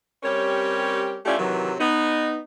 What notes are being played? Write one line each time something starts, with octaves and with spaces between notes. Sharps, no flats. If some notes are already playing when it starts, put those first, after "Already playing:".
G3 C4 C#4 G4 A#4 C#5
A3 C#4 E4 F4 G4 D5
C3 D#3 E3 F#3
B3 D#4